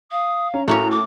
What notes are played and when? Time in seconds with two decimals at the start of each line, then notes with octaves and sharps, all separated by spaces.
0.12 F5 D#6
0.54 C#4 A#5
0.68 A2 A3 A#3 C#4 F#4 A#5
0.91 D6